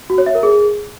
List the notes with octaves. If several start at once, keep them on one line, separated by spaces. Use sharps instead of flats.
F#4
C#5
E5
A#4
G#4